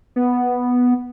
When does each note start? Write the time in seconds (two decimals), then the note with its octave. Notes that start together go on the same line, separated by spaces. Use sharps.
0.16 B3